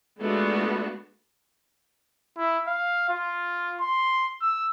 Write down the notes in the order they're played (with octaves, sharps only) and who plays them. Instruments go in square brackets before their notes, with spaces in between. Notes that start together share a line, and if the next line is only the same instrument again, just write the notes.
[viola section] G#3 A3 B3 D4 F4 F#4
[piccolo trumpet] E4
F5
F4
C6
E6